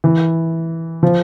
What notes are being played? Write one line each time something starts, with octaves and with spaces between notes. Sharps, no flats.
E3
F3